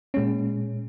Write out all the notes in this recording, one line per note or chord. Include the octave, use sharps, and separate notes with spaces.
A#2 G#3 C#4